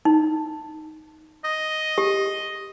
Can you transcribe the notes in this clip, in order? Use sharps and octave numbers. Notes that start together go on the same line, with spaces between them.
D#4
D#5
G4